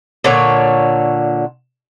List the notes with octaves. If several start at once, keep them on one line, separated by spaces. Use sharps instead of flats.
A#2 D3 C#5